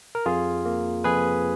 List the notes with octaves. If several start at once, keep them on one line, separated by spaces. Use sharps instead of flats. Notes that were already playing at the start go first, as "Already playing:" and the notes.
A#4
F2 F4 G#4
A#3
F2 G#4 B4